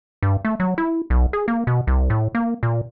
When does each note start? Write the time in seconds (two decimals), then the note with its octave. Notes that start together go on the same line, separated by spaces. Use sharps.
0.23 G2
0.45 A3
0.60 F#3
0.78 E4
1.10 B1
1.33 G#4
1.48 A#3
1.67 B2
1.87 C2
2.10 A2
2.35 A#3
2.63 A#2